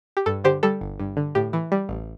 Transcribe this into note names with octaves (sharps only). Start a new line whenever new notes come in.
G4
G2 A4
D3 G4 C5
G3 A4
G1
G2
D3
A2 G4
E3
G3
A1